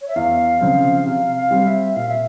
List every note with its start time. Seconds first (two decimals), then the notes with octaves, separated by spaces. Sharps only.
0.01 C#5
0.08 E5
0.16 E2 F5
0.61 C#3 F3 C4
1.06 C3 F5
1.36 F5
1.51 G3 C4
1.66 E5
1.96 A#2 F5
2.09 E5